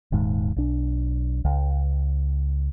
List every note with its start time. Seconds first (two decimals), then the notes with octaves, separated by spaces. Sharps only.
0.12 D#1 D#2 G#2
0.56 B1 D4
1.45 C#2